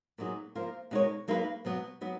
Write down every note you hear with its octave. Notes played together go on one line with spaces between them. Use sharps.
A#2 F#3 B3 D#4 G#4
F3 A#3 F4 A#4
B2 G#3 D#4 A#4 C#5
F#3 A#3 D#4 G#4 B4
B2 F#3 B3
F#3 B3 D#4